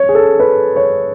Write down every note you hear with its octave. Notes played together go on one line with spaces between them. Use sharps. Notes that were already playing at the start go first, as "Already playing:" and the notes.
Already playing: C#5
G#4
A4
B4
C#5